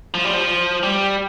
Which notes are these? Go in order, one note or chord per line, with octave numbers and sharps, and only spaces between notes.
F3
G3
F3
G3